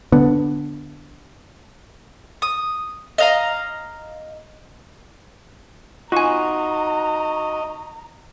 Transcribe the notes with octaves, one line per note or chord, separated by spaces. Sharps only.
D3 B3
D#6
D#5 F5 A#5
D#4 F4 F#4 D#5 G#5 A#5